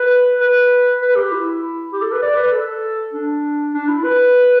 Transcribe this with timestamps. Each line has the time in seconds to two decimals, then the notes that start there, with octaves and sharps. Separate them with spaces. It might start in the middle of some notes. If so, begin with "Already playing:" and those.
Already playing: B4
0.41 B4
1.01 B4
1.16 G4
1.32 E4
1.92 G4
2.02 A4
2.12 B4
2.22 D5
2.37 B4
2.52 A4
3.13 D4
3.74 D4
3.88 E4
4.04 B4